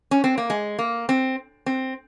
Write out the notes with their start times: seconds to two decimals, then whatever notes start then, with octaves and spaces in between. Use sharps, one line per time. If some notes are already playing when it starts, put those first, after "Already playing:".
0.11 C#4
0.24 C4
0.38 A#3
0.50 G#3
0.79 A#3
1.09 C4
1.66 C4